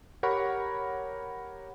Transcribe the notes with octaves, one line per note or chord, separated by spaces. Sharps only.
G4 A#4 C#5 F#5 B5 C#6